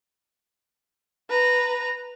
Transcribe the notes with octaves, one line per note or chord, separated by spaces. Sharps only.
B4 A#5